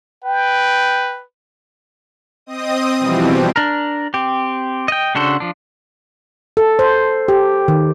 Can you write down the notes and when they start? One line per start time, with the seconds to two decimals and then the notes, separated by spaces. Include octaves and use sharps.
0.24 B4 G5
2.46 C4 D#5 D#6
2.99 B2 E3 F3 G3 C4
3.56 D4 A#4
4.14 C4 G4
4.88 D#5 G5
5.15 C#3 D4 F#4 A4 C5
5.40 F3 D4
6.57 A4
6.79 C5
7.28 G4
7.68 D#3